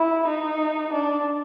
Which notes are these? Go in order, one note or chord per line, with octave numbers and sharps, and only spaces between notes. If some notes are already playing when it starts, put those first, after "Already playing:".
Already playing: E4
D#4
D4